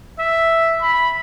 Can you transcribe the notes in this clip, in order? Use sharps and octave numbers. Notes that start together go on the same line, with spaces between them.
E5
B5